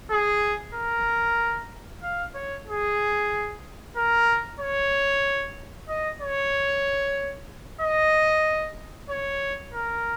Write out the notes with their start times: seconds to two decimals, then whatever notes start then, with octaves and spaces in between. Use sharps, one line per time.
0.11 G#4
0.74 A#4
2.03 F5
2.35 C#5
2.67 G#4
3.96 A#4
4.60 C#5
5.89 D#5
6.21 C#5
7.81 D#5
9.10 C#5
9.74 A#4